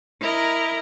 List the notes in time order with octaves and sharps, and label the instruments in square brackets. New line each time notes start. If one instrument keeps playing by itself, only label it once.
[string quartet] E4 A#4 D#5 A#5